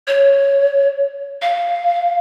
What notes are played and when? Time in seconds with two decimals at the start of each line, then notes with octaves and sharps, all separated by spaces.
0.07 C#5
1.42 F5